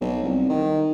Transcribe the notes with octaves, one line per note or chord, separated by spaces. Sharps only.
B1
C2
D#3